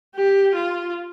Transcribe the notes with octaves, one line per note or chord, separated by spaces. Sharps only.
G4
F4